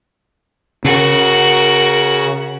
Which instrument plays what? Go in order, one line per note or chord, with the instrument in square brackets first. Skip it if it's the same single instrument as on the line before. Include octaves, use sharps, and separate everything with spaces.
[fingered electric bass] C#3 [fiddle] F#4 A#4